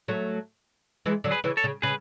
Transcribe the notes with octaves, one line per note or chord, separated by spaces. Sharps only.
F#3 A3
E3 G#3
D3 F#3
G#4 B4
C#3 E3
A4 C#5
C#3
C#3 G#4 B4